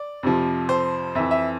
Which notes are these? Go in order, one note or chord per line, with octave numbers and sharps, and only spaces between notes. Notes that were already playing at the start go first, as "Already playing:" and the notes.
Already playing: D5
F2 C3 F3
C5
F2 E3 E5
E5